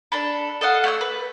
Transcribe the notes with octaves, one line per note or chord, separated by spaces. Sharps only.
D4 A4 B5
A4 D#5 F5 F#5
A3 C#4 G5 E6
B4